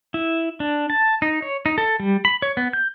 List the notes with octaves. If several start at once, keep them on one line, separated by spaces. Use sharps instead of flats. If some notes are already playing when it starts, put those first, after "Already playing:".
E4
D4
A5
D#4
C#5
D#4
A4
G3
B5
C#5
B3
G6